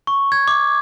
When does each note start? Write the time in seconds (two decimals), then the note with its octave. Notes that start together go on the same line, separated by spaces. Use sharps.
0.07 C#6
0.32 G#6
0.48 D6